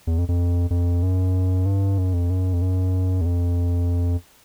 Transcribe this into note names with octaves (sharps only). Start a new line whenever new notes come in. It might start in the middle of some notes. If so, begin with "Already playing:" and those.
E2
F2
F2
F2
F#2
G2
F#2
F2
F#2
F2
F#2
E2
F2